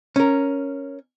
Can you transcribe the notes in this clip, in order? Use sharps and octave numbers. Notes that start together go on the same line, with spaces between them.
C#4 A#4